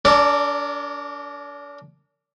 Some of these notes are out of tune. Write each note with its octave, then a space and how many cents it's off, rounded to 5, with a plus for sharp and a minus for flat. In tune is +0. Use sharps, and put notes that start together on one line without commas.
D4 -40 A#4 -35 D5 +0